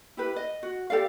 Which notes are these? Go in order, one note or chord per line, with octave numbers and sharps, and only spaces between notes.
E4 G4 B4
D#5
F#4
G4 A4 D5 F5